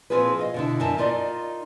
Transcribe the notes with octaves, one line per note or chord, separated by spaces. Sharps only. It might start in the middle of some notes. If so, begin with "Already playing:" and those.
A#2 F3 C4 F4 G#4 B4
D#5 F5
B2 D3 E4
F#2 D4 A#4 E5 A5
D#4 F4 A#4 D5 D#5